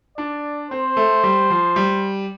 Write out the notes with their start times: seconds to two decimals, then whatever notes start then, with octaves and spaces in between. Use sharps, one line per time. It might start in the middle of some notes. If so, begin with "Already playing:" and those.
0.17 D4 D5
0.71 C4 C5
0.97 A3
1.24 G3
1.50 F3
1.76 G3